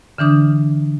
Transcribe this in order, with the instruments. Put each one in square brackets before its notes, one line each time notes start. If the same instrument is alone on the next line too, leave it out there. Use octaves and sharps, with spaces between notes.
[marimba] D3 E3 D4 D#6